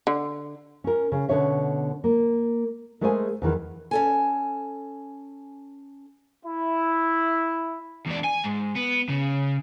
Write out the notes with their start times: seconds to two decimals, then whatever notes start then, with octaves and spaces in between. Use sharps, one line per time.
0.07 D3
0.84 C#4 A#4
1.12 C#3
1.29 B2 D3 C#4 C#5 E5
2.04 A#3
3.01 G#3 A3 G#4 A#4 C5 G#5
3.42 E2 D#3 E3
3.91 C#4 A4 G#5
6.45 E4
8.07 E2 D4
8.24 G#5
8.44 G#2
8.75 B3
9.09 C#3